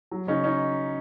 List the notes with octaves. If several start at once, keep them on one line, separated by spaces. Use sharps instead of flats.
F#3
C#3 C#4 D#4
C#4 D#4